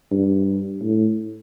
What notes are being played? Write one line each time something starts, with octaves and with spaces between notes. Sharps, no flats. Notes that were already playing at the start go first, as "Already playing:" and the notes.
G2
A2